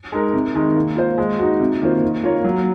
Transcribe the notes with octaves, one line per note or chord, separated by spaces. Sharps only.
G#3 D#4 A#4
C3
D#3 G#3 D#4
A#3
F4 C5
G#3
D#4 F#4
C3
D#3 A#3 F4 C5
D#3
A#3 F4 A#4 C#5
F#3